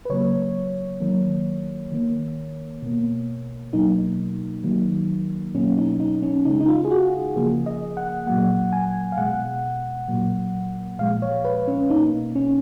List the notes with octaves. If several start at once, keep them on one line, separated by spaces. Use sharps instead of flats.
B4
C#3 F#3 A#3 C#5
D#3 F#3 A#3
D#3 A#3
B2 A#3
B2 F#3 A#3 D#4
D#3 F#3 A#3
B2 F#3 A#3 C#4
D#4
D#4
C#4
C#3 G#3 D#4
D#4
F4
G#4
F#4
C#3 F3 A#3 G#4
D#5
F#5
A#2 F#3 A#3 F#5
G#5
F5
B2 G#3 F#5
A#2 F#3 A#3
A#2 F3 G#3 F5
C#5
B4
C#4
B2 A#3 D#4
C#4